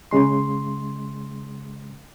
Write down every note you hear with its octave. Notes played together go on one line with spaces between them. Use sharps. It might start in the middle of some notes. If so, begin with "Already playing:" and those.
C#3 G#3 C6